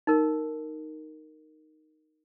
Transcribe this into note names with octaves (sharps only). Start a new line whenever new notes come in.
D#4 A#4